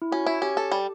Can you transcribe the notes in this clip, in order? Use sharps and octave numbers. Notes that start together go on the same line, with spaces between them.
E4
C#4 F#4
E4
C#4 G4
A4
G3